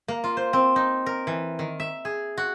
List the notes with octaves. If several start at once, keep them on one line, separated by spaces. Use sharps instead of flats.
A#3
F4
C5
C4
D#4
A#4
E3
D#3
E5
G#4
F#4